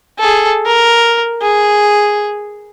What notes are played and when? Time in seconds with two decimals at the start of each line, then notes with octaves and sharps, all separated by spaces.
0.19 G#4 A4
0.66 A#4
1.42 G#4